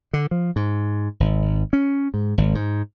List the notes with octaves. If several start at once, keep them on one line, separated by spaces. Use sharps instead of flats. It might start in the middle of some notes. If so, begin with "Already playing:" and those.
D3
F3
G#2
G#1
C#4
G#2
G#1
G#2